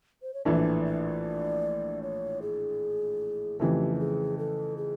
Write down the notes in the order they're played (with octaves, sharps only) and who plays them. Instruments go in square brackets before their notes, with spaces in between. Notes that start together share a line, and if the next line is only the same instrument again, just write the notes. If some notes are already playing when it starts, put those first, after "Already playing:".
[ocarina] C5
C#5
[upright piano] A#1 A2 E3 A3 D4 [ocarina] D5
[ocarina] D5
C#5
G#4
[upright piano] F2 C#3 E3 A3 [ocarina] G4
[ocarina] A4
G#4
A4
G#4